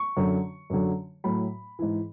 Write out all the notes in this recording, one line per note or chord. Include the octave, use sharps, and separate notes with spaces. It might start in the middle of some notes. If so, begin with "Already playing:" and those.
Already playing: C#6
F#2 D3 F#3
F#2 D3 F#3
A2 F#3 B5
G#2 E3